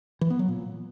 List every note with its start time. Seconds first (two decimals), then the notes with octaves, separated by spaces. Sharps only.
0.21 E3
0.30 B3
0.39 F#3
0.48 A#2